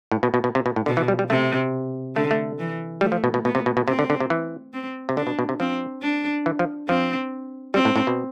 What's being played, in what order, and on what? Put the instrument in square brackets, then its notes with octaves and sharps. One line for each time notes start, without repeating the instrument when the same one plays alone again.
[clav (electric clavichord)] A2
B2
B2
B2
C3
B2
A2
[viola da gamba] B2 [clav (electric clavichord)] D3
[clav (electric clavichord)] E3
G3
G3
[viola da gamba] C3 [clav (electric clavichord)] A3
[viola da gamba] D3 [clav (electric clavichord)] A3
[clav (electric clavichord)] A3
[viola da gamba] E3
[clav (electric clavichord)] G3 [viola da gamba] A3
[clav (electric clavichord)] F3
B2
B2
[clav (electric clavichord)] B2 [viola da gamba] B3
[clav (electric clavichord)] C3
B2
B2
[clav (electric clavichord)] C3 [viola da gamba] C4
[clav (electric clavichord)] D3
D3
C3
E3
[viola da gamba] C4
[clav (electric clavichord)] C3
[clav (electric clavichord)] D3 [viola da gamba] D4
[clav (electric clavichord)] B2
B2
C3
[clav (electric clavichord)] F3 [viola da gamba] C4
[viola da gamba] D4
[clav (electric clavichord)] E3
F3
[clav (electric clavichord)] F3 [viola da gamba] C4
[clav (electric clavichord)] G3 [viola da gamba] C4
[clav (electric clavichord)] A2
A2
B2